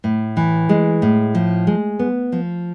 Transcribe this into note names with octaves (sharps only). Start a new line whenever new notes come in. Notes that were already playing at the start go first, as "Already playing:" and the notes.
A2
E3
G#3
A2
F3
G#3
B3
F3